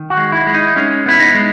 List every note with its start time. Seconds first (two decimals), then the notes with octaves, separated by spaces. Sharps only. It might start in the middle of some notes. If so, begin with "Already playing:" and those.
Already playing: D#3
0.10 F#4
0.17 G#3
0.32 E4
0.47 G#3
0.54 D#4
0.76 G#3 C#4
1.06 B3 E4
1.20 D#4
1.35 G#3